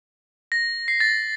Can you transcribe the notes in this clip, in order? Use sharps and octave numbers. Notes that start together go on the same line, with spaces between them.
A#6
C7
A6